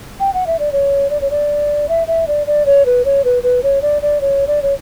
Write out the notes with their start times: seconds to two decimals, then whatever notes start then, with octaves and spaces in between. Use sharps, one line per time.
0.20 G5
0.34 F#5
0.47 E5
0.59 D5
0.72 C#5
1.10 D5
1.21 C#5
1.31 D5
1.89 E5
2.08 E5
2.28 D5
2.47 D5
2.66 C#5
2.86 B4
3.05 C#5
3.25 B4
3.43 B4
3.63 C#5
3.82 D5
4.02 D5
4.21 C#5
4.47 D5
4.62 C#5